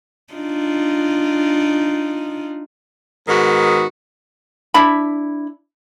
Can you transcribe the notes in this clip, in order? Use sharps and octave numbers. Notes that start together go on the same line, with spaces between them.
D4 D#4 F4
G#2 D#3 B3 F#4
D4 E4 B5